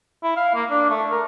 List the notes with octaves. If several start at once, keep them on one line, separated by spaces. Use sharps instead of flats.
E4
F5
A#3
D4
A3
A#4